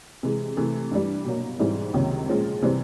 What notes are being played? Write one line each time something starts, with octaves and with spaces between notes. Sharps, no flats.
C3 E3 G#3
C3 E3 A3
G2 E3 G3
B2 F#3 A#3
G#2 E3 G3 C4 E4
C#2 C3 D#3 F#3 A#3
A#2 F3 G#3 C#4
C3 E3 G3 C4